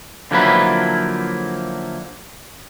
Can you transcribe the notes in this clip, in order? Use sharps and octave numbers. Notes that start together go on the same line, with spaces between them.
D3 F3 F#3 A#3 E4 B4